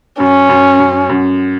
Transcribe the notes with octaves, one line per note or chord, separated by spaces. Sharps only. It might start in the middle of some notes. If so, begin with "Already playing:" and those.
F#2 C#4
F#2
F#2
F#2